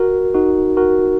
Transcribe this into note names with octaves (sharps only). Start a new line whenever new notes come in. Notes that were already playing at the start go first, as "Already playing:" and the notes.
Already playing: F#4 A#4
D#4 F#4
F#4 A#4